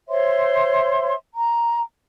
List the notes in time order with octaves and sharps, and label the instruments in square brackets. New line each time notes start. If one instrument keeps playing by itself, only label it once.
[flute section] C5 C#5 E5 C6
A#5